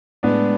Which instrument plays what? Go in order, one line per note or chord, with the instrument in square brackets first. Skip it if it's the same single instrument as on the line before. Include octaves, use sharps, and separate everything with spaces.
[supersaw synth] A2 G#3 [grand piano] B3 D4